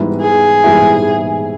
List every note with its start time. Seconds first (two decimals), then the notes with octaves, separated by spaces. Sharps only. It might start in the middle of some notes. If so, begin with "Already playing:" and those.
Already playing: G#2 E3 G3 B3 E4
0.21 G#4
0.64 G#2 E3 G3 B3 E4